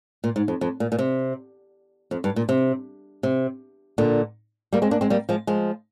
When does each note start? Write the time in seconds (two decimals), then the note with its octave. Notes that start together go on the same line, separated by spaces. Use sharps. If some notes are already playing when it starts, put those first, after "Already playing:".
0.24 A#2
0.36 G#2
0.48 F2
0.61 F2
0.80 A#2
0.92 A#2
0.99 C3
2.11 F2
2.24 G2
2.36 A#2
2.49 C3
3.23 C3
3.98 A#2 D3
4.73 G3 A#3
4.82 G#3 C4
4.91 A#3 D4
5.01 G#3 C4
5.10 G3 A#3
5.29 F3 G#3
5.47 F3 G#3